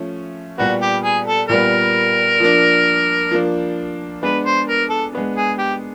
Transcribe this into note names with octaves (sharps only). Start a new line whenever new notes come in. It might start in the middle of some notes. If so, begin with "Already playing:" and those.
Already playing: F3 A3 C#4
A#2 G3 B3 F#4
G4
G#4
A4
A#2 G3 B3 A#4
F3 A#3 D4
F3 A#3 D4
G#3 B3 D4 B4
C5
A#4
A4
G#3 B3 D4
G#4
G4